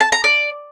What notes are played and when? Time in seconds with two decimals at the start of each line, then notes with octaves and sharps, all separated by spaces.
0.01 A5
0.12 A#5
0.24 D5